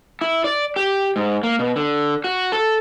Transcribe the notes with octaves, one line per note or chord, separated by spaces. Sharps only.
E4
D5
G4
G#2
A#3
B2
D3
F#4
A4